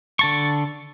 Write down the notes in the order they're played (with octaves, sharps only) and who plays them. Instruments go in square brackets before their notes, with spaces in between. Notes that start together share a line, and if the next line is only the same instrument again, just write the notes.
[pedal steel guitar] D3 A5 C#6